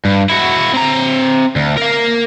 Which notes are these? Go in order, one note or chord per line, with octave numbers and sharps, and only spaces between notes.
G2
E4 F#4
C4 A#5
D2
A#4 F5